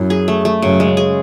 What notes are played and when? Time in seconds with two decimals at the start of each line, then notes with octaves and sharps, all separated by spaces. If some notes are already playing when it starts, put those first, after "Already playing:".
Already playing: F#2 E4
0.10 G#4
0.28 A3
0.45 A3
0.62 F#2 C#3
0.80 G#3
0.97 G#4